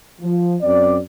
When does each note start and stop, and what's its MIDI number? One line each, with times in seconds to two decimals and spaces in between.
0.22 0.56 53
0.62 0.98 42
0.62 0.98 60
0.62 0.98 74